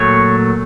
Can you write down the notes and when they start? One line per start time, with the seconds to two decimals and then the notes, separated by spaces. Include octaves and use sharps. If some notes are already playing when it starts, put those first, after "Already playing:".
Already playing: A#2 F#3 A3 C#5